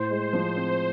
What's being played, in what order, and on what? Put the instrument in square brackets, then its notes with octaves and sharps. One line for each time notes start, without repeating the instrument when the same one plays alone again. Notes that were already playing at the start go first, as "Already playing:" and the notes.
Already playing: [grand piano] A2 [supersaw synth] C5
[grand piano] G#3
F3
C4